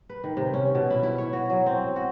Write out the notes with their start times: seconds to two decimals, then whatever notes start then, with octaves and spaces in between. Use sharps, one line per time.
0.09 B4
0.24 D#3
0.37 C3
0.54 C#4
0.75 B2
0.90 E4
1.03 E4
1.18 C#5
1.33 F#4
1.50 F#3
1.66 C4
1.96 F#4